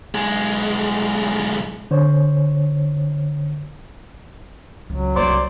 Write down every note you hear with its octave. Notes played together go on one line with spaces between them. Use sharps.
B1 G#3
D3 C5 C#5
C#2 F#3
C2 D4 C5 D5 C6